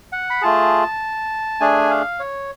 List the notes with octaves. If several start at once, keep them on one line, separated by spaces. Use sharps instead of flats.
F#5
B5
A3 F4 G#4 A5
A3 D4 G#4 G#5
F5
C#5